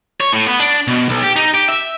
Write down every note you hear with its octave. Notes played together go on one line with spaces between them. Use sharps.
C#5
A2
B3
D4
B2
B1
G4
D#4
G4
E5